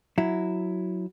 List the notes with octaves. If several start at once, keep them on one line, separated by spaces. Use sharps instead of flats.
F#3 E4